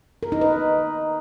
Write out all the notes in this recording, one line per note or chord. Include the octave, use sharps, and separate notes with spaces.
A#4
D#4
B4